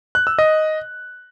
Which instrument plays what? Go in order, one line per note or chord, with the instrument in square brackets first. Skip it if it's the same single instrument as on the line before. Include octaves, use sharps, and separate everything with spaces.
[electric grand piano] F#6
E6
D#5